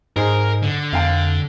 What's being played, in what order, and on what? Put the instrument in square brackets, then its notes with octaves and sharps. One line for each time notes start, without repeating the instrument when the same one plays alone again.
[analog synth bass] G#2 [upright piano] D#4 G#4 C5 [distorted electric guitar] A#4
[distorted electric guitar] D3
[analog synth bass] F2 [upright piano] F5 G5